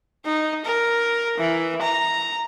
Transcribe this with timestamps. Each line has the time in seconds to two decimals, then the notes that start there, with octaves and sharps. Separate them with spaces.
0.25 D#4
0.65 A#4
1.38 E3
1.81 A#5